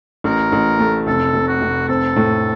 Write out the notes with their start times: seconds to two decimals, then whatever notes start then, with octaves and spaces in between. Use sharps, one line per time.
0.24 A1 A#4
0.52 A1
0.79 A3
1.07 F1 A4
1.34 F1
1.48 F#4
1.62 F1
1.89 C4 A4
2.16 A2